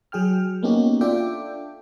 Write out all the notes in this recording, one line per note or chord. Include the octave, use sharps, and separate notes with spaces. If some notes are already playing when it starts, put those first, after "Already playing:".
F#3 G#4 G5 F6
A#3 B3 C#4 D#4 F#4 G4
D4 F4 A4 E5 G5 D6